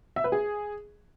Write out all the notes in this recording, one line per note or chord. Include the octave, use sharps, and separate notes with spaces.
E5
B4
G#4